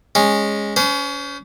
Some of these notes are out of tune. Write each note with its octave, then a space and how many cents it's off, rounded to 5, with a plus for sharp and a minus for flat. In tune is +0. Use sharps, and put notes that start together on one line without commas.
G#3 -10 C#4 -10
C#4 +30 C5 -30